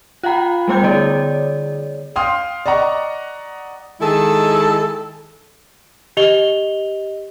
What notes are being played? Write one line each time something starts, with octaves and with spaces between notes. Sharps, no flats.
F4 F5 G5 A#5 B5
G3 A3 B3 C5 G5 G6
D3 G#4 C#5 D5
F5 G5 C6 D#6 F6
D5 D#5 F#5 A#5 C#6
D#3 G#3 E4 G#4 A4
G4 D#5 F7 G7